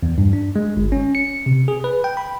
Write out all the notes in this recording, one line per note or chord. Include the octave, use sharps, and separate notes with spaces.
E2
G2
D4
G#3
G1
C#4
C#7
C3
G#4
B4
G5
B5